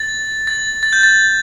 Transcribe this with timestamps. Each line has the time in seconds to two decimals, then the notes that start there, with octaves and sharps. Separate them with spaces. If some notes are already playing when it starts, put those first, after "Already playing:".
Already playing: A6
0.47 A6
0.83 A6
0.93 G6
1.03 A6